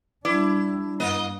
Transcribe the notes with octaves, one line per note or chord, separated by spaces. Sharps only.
G3 D4 E4 D5
G2 A#3 D#5